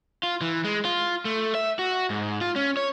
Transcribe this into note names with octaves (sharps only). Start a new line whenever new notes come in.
F4
E3
G#3
F4
A3
E5
F#4
G#2
F4
C#4
C#5